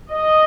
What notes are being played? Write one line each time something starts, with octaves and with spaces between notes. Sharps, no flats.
D#5